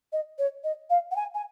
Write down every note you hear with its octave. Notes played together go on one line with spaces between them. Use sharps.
D#5
C#5
D#5
F5
F#5
G#5
G#5